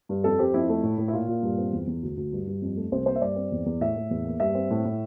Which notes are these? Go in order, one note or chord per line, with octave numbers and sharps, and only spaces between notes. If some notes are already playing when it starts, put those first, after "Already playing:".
G2
F2 A4
C4 G4
F2 E4
A3
A2
A2
E4
A#2 F4
A#2
G2
C4
E2
E2
D2
D2
G2
G2
F2
A3
C2 C5
A#3 C5
E5
G2 D5
C4
E2
E2
A2 E5
A2
E2
A#3
G2 E5
C4
A2
A2